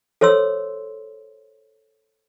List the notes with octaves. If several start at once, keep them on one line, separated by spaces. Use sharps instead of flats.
A4 C5 C#5 C6 E6